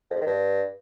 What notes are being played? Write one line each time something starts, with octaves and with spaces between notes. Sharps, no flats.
F2
G#2
D#3
G2